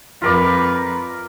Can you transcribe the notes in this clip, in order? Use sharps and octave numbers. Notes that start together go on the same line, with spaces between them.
F2 F4 A#4 B4 D5